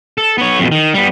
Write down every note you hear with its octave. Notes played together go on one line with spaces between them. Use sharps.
A4
B3 C#5
F2 B2
D#3
G3 B3